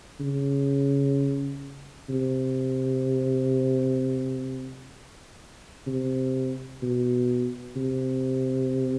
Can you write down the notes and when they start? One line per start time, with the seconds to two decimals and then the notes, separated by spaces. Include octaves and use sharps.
0.20 C#3
2.09 C3
5.87 C3
6.82 B2
7.76 C3